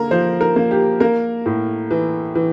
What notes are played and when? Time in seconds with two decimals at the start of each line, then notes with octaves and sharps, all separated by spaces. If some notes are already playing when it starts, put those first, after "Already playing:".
Already playing: D3 A#3 A#4
0.11 F3 C5
0.41 A#4
0.56 A#3
0.71 G4
1.00 A#3 A#4
1.46 A2
1.91 E3
2.35 E3